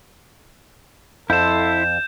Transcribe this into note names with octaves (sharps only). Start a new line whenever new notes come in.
F2 E4 A4 C5 G6 E7